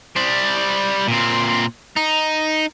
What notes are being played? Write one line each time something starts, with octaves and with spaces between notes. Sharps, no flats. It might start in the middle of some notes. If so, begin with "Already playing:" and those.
G3 C5
A#2 C4
D#4